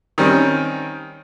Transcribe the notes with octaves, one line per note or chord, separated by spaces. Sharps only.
D#3 G3 C4 C#4